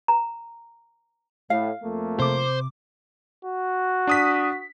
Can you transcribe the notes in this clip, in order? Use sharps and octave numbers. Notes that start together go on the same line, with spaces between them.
A#5
A2 F5
F2 A3 A#3
C3 C5 D6
F#4
D4 D#6 B6